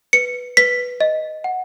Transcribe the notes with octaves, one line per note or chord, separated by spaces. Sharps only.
B4 C#7
B4 B6
D#5
F#5